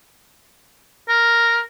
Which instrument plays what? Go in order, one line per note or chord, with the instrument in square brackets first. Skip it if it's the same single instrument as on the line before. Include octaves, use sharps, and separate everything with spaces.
[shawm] A#4